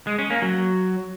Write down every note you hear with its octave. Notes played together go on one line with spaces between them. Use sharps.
G#3
C#4
A#3
F#3